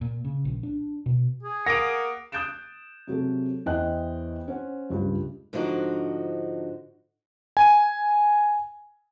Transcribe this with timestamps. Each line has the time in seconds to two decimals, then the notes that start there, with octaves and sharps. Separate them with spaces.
0.01 A#2
0.25 C#3
0.45 A#1
0.63 D4
1.06 B2
1.43 G#4
1.66 A#3 F#5 D#6 A#6 D7
2.32 D#6 F#6 G6 A6 D7 E7
3.07 C3 F#3 G#3 A4
3.66 E2 E4 C5 D#5 G5 F#6
4.48 C#4 C5 F#5
4.90 C#2 G2 F4
5.53 G#2 D3 F3 D4 D#4 F#4
7.57 G#5